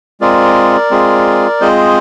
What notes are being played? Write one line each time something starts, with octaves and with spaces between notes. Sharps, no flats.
G#3 C4 F4 G#4 A#4 D5
G#3 C4 F4 G#4
G#3 C4 F4 G#4 C5 D#5